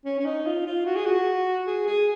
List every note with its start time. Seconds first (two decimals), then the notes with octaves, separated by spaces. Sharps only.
0.05 C#4
0.19 C#4
0.25 D#4
0.46 F4
0.66 F4
0.86 F#4
0.96 G#4
1.06 F#4
1.67 G#4
1.87 G#4